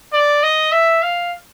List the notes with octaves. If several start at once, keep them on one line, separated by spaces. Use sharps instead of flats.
D5
D#5
E5
F5